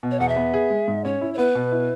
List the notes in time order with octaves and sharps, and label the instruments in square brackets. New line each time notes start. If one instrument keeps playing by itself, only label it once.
[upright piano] B2
[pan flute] C#5
[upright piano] E2 [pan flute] F#5
[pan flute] E5
[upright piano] B3
G#4
G#3
G#2
[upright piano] C#4 [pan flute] C#5
[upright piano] E4
[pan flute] C#5
[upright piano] B3 [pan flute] B4
[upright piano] B2
E4